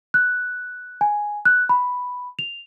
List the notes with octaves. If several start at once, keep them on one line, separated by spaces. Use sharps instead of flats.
F#6
G#5
F#6
B5
F7